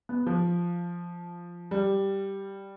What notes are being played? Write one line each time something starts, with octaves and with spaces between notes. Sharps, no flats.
B3
F3
G3